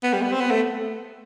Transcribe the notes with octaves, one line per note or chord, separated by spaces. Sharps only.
B3
G3
B3
C4
B3
A3